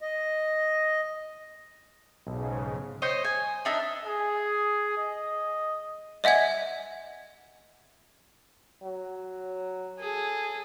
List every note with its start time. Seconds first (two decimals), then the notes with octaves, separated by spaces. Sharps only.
0.01 D#5
2.27 B1 G#2 C#3
3.02 C5 C#5 D#5
3.24 G#5
3.65 D4 D#4 E5
4.05 G#4
4.98 D#5
6.24 D#5 E5 F#5 G#5 G#6
8.83 F#3
9.99 G#4 A4